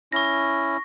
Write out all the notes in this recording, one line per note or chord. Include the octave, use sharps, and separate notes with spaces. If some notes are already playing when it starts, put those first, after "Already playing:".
C#4 E4 C#6 A#6